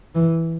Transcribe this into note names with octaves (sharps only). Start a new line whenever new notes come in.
E3